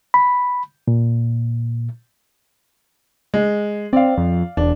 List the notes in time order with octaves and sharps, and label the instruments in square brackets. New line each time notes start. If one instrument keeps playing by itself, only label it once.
[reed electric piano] B5
A#2
[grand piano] G#3
[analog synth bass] C4 [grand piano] D5 F5
[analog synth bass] F2
[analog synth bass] E1 [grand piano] D4